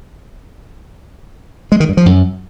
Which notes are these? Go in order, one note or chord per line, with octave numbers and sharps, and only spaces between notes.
G#3
D#3
G2
F3
F#2